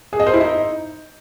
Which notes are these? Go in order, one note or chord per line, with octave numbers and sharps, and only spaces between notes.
G#4
D#5
C5
E4
D#4